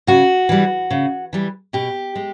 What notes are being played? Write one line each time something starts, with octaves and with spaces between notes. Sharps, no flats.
C#3 F#4
E3 G3
C#3
E3 G3
B2 G4
G#3